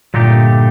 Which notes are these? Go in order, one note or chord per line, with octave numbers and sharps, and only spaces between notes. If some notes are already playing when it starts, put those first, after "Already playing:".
G2 A#2 D3 A3 D#4 G4